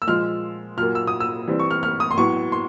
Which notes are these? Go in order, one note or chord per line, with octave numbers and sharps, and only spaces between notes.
E6
A#2 F3 G#3 F6
A#2 F#3 A#3 F6
E6
D#6
E6
E3 G3 C4
C#6
F6
F6
D#6
C6
A2 F#3 B3 C#6
C6